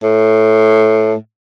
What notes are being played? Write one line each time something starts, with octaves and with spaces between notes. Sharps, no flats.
A2